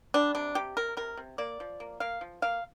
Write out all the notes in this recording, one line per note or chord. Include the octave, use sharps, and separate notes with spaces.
G3 D4
C3 D4
C3 G4
C3 A#4
C3 A#4
C3
A#3 D5
F3
A#3
A#3 F5
F3
A#3 F5